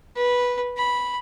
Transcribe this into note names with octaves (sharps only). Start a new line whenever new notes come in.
B4
B5